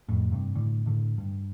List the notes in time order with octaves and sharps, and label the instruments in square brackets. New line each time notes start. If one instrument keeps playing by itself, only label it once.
[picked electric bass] F2 A2
G2 C3
A2 D3
A2 D3
G2